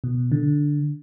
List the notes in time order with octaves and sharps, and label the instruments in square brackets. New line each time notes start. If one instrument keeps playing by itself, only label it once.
[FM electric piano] B2
D3